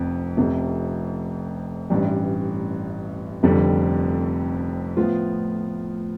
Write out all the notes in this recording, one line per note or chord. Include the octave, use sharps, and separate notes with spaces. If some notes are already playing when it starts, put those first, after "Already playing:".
Already playing: F1 F2
F1 F2 C3
A1 G2 E3 G3
F1 F2 D3 G3
A2 F3 B3 F4